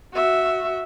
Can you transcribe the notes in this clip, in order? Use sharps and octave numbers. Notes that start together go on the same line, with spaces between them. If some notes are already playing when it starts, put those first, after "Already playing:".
F#4 E5